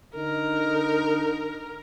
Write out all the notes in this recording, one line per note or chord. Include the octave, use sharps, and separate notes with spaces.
D3 D#4 A#4